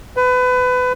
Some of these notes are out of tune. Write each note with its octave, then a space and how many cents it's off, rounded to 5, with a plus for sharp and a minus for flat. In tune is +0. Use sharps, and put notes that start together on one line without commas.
B4 +25